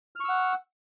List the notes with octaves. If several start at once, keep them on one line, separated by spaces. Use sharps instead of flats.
F#5 C#6 E6 F6